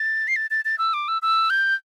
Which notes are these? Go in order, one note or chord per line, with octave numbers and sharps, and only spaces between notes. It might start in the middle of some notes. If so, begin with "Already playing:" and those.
Already playing: A6
C7
A6
A6
A6
E6
D6
E6
E6
G6